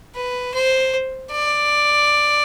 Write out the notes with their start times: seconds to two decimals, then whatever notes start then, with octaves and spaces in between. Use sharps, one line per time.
0.15 B4
0.54 C5
1.32 D5